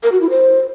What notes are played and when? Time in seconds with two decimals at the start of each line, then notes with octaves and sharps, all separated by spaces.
0.03 A#4
0.12 F#4
0.21 E4
0.30 C5